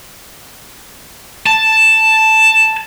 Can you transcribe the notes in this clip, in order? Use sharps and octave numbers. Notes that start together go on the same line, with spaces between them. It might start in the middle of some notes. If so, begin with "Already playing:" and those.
A5